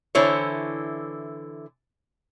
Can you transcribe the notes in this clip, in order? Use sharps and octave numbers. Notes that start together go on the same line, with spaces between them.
D3 E3 E4 C5 C#5